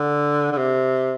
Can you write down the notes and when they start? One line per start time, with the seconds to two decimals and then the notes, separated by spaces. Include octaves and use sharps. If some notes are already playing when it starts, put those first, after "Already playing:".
Already playing: D3
0.52 D3
0.57 C3